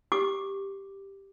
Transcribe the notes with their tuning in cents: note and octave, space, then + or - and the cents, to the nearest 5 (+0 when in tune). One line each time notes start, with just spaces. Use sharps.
G4 +0 D6 +0